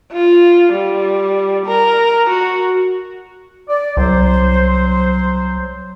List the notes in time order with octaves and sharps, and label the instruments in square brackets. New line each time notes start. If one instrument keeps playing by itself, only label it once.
[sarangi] F4
G3
A#4
F#4
[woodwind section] D5
[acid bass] C2 [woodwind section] F#3 C5